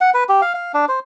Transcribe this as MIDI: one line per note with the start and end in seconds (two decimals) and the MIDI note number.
0.01 0.10 78
0.14 0.24 71
0.29 0.41 67
0.42 0.53 77
0.54 0.72 77
0.74 0.85 62
0.89 0.99 72